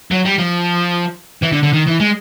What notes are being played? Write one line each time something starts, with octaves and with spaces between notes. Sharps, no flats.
F#3
G3
F3
E3
D3
D3
D#3
E3
G#3